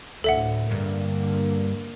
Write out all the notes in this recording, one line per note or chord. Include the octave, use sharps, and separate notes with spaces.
D2 A2 A4 E5 F#5
G2 D3 A#3